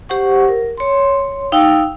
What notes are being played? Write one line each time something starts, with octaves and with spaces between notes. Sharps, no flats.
G4 C5 F#5 C#6
A#4
C#5 C6
D#4 F5 G5 E6